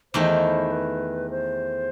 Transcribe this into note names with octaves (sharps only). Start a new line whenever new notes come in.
E2 D#3 A3 E4 C5
B4
C5